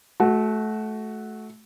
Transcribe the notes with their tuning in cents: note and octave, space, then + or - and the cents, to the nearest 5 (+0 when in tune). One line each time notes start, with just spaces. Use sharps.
A3 -25 F#4 +0